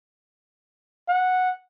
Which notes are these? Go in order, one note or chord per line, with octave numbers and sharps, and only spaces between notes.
F#5